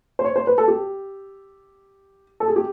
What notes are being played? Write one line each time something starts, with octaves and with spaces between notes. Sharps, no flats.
C5
C#5
C5
B4
A4
G4
A4
G#4
G4